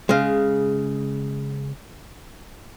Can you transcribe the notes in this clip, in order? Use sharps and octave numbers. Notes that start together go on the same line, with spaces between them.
C#3 G#3